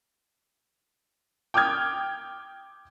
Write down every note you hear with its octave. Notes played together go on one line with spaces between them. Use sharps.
G5 D6 D#6 F6 G#6